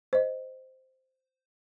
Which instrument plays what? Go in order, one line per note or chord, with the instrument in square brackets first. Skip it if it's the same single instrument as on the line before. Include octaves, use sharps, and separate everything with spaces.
[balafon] C5 D#5